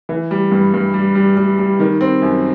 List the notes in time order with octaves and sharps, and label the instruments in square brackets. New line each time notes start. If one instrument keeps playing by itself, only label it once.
[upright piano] E3
G3
G2
G2
G3
G3
G3
G3
D#3
C4
F#2